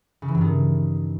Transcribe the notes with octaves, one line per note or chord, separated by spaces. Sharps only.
C#3
E3
G2
D#3